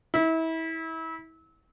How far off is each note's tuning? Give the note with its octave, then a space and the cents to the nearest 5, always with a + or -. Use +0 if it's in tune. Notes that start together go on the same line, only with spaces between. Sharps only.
E4 -30